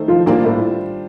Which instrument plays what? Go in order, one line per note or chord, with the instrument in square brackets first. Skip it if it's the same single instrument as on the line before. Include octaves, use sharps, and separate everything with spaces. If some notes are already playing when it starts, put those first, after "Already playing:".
Already playing: [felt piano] D#3 A3 D#4 A4 C5
[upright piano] F3 F4
[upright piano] A#2 A#3 [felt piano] G3 D4 F4 C5
[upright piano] A2 A3